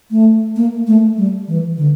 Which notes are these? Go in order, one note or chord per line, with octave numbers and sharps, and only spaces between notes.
A3
A#3
A3
G3
E3
D3